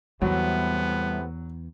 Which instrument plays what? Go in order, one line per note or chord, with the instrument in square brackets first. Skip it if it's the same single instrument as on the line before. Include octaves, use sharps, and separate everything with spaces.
[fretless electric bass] E2 [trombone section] A2 C3 B3 [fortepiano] F#3 [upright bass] G3